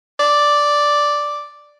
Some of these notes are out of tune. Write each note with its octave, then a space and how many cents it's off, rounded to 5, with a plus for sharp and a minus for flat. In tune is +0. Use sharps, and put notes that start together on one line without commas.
D5 +0